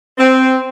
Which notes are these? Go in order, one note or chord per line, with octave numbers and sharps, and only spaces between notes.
C4